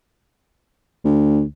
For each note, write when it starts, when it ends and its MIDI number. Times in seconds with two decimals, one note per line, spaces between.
1.04 1.42 38